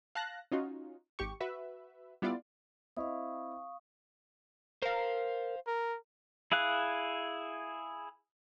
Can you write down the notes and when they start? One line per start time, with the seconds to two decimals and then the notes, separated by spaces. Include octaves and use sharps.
0.15 F5 A5 F#6 A#6
0.52 C#4 D#4 F4 F#4
1.19 G#1 G4 C#6
1.40 F#4 B4 E5
2.22 G3 B3 E4 F4 D5
2.97 C4 E4 D#5 F5 C#6 D#6
4.82 A#4 C5 F5
5.67 A#4
6.52 E4 G#4 F5 F#6